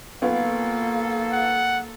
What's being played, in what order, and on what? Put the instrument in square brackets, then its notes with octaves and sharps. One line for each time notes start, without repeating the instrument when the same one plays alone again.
[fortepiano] B1 B3 F4 [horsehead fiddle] A#3 A4 [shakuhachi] F5
[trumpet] F#5